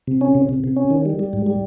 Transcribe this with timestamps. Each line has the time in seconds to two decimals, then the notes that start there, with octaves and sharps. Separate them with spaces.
0.07 C3
0.21 C#4
0.35 C3
0.49 C3
0.64 C3
0.76 C#4
0.90 D#3
1.05 G3
1.19 G3
1.33 G#2
1.46 G3